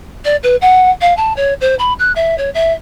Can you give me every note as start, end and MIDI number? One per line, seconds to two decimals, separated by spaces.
0.24 0.36 74
0.43 0.56 71
0.61 0.90 78
1.01 1.15 77
1.17 1.35 81
1.36 1.53 73
1.61 1.75 72
1.79 1.93 83
1.99 2.12 90
2.15 2.37 76
2.37 2.49 73
2.54 2.72 76